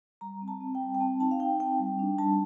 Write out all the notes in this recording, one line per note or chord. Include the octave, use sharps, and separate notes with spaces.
G3 A#5
C4
A5
C4
G5
G3
G5
C4 A5
D#4 A5
F5
D#4 G5
C4 G5
G3
D4
G3 A5